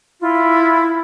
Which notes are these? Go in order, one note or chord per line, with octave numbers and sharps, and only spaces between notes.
E4 F4